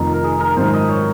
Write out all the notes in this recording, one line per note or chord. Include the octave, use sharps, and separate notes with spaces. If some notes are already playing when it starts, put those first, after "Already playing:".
Already playing: F1 F2 D#3 D#4 F4
A#4
G#4
A#4
G#1 F#2 D#3 C5
D#5
C#5